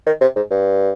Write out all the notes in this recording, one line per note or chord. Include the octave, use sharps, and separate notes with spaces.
D#3
C3
G#2
G2